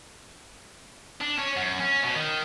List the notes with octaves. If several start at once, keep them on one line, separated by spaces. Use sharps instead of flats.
D4
C#4
F#2
C#4
B2
D#3